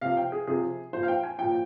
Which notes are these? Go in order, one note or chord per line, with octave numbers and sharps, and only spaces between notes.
C3 F3 F5
G5
G#4
C3 F3 G#4
A#2 F3 C5
F5
G5
G#5
A#2 F3 G5